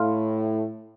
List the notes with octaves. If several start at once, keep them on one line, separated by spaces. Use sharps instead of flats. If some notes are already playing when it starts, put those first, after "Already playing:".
Already playing: A2 F5 C6 F6